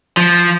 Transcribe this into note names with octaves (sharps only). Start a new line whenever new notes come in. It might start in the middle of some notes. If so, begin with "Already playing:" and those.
F3